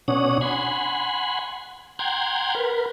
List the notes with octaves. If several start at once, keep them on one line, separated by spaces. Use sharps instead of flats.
B2 C#4 D4 C#5 F#5 D#6
F#5 G#5 B5 C6
F#5 G5 A#5 C6 G6 G#6
A#4 B4